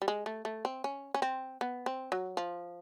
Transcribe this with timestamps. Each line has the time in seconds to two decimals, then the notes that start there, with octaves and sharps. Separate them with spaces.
0.02 G3
0.08 G#3
0.26 A3
0.45 A3
0.65 C4
0.84 C#4
1.14 C#4
1.22 C4
1.61 B3
1.86 C4
2.12 F#3
2.37 F3